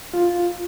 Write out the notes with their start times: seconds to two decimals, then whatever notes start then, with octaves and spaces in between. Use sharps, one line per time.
0.14 F4